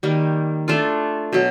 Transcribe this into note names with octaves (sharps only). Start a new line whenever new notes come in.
D#3 G3 A#3
A3 D4 F4
B2 F#3